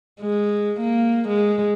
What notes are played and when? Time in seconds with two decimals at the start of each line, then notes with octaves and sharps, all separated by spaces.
0.21 G#3
0.81 A#3
1.28 G#3